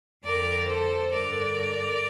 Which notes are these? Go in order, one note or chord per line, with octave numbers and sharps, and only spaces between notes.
F2 D3 A#4 D5
A4 C5
G2 D3 A#4 D5